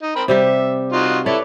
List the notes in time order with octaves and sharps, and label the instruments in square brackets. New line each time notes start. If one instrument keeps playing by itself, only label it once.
[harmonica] D#4
C4 A#4 B5
[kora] C3 G3 G4 [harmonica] E5
[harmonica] D#4 F4 F#4
[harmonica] E4 A4 [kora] B4 C#5 D5